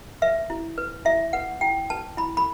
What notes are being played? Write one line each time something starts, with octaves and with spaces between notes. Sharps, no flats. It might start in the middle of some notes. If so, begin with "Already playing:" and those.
B4 E5
E4
B4
E4 E5
B4 F#5
E4 G5
B4 A5
E4 B5
B5